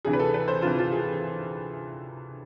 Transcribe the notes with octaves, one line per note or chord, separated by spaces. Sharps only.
D2 C3 E3 G#4
B4
A4
B4
C5
D2 C3 E3 F4
F4
G#4